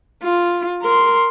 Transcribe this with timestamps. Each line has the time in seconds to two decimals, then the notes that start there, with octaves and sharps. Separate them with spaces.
0.23 F4
0.82 A#4 C6